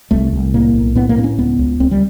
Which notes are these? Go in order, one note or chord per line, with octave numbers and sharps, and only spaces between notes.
C2 A3
C2
A2 A#3
B1
A2 B3
A#3
A2 C4
C#4
C#2 B3
C#2
C#2 C4
G3